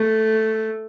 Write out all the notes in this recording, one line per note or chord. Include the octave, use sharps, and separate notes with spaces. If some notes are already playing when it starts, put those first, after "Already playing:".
Already playing: A3